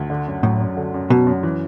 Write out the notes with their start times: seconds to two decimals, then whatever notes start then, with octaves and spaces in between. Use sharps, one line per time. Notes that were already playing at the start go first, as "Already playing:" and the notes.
Already playing: D2
0.10 D3
0.27 F#2
0.43 A2 F#3
0.60 F#2
0.77 D3
0.94 F#2
1.10 B2 F#3
1.27 F#2
1.43 E3